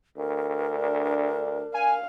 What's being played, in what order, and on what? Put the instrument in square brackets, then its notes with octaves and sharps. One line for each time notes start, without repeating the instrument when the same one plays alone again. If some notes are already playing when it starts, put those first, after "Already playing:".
[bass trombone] D2 [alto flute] A#4
[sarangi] D4
[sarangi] F5 [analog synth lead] G#5